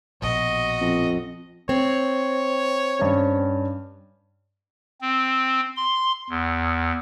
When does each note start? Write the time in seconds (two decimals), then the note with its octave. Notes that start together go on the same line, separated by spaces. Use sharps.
0.22 A#1 B2 F#4 D#5
0.81 F2
1.69 C4 C#5
2.99 G2 C#4
5.01 C4
5.77 C6
6.30 E2